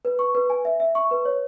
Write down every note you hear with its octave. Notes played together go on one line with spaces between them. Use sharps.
B4
C#6
B4
G#5
E5
E5
C#6
B4
C#5